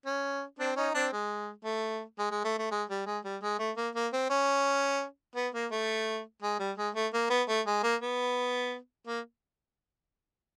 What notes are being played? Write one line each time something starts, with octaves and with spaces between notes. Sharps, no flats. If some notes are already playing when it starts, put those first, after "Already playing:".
C#4
C4 D4
C#4 D#4
C4 D4
G#3
A3
G#3
G#3
A3
A3
G#3
G3
G#3
G3
G#3
A3
A#3
A#3
C4
C#4
B3
A#3
A3
G#3
G3
G#3
A3
A#3
B3
A3
G#3
A#3
B3
A#3